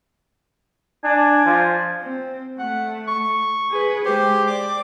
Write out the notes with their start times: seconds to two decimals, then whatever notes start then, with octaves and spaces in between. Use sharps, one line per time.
1.04 D4 G#5
1.45 F3
2.01 C4
2.59 A3 F#5
3.08 C#6
3.70 G#4 B4
4.05 G#3 G4 C5
4.47 D5 D6